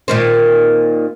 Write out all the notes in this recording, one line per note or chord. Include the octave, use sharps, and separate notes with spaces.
A#2 D#3 C4